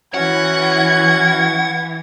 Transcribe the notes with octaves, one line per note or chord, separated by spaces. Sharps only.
E3 C#4 F#4 C#5 F#5 G#6